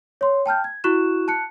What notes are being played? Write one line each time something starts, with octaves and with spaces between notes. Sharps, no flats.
C#5 C6
G5 A5 F6 G6
G#6
E4 F#4 C#6 F#6 E7
A5 F#6 C#7